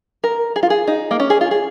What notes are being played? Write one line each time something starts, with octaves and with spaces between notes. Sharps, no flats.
A#4
G#4
F4
G#4
D#4
A#3
C#4
G#4
F4
G#4